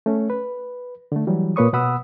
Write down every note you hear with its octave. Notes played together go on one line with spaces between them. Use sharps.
A3 C#4
B4
D3 A3
E3 F#3 G3
A#2 A#3 B4 C#5 C#6 D#6
B2 B3 F#5 B5 D#6 E6